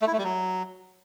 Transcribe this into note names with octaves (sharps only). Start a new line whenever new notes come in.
A3
E4
A3
G3
F#3